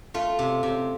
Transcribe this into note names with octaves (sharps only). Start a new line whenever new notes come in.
A3 F4
C3
C3